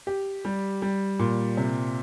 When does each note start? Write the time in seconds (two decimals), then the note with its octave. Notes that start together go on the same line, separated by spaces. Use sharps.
0.07 G4
0.45 G3
0.82 G3
1.19 A#2
1.57 C3